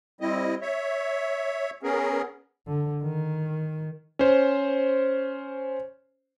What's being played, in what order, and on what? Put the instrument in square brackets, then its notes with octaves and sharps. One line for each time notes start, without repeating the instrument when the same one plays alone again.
[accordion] G3 C4 E4 D#5
C#5 E5
B3 C#4 G#4 A#4
[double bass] D3
D#3
[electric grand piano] C#4 C5